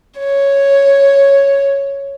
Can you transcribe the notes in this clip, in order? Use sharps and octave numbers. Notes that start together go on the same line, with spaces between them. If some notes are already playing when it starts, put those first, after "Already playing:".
C#5